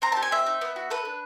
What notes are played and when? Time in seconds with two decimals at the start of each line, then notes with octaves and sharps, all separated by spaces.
0.02 C4 A#5
0.12 G4 A5
0.22 G#5
0.31 C4 E5
0.46 D#4
0.61 B3
0.76 F#4
0.90 A4 B4
1.05 D4